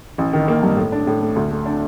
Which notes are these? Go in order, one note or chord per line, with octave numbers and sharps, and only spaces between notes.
A1
D#3
A#3
G2
A2
D4
A2
A3
D2
A3
D4